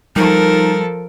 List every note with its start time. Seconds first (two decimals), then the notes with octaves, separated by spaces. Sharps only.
0.16 F3 G3 D#4 A4 A#4